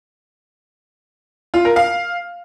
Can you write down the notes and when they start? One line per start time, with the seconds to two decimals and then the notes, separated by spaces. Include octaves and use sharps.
1.54 F4
1.65 A#4
1.76 F5